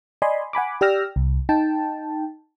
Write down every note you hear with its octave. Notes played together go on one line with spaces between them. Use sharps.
D5 D#5 G#5 B5 C6
F#5 G#5 B5 D6
G4 D5 G5 E6 F6 A#6
C2
D#4 G5 A5